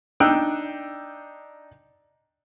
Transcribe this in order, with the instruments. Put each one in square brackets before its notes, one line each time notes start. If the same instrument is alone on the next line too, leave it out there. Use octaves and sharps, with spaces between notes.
[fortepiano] D4 D#4 G5 E6 F#6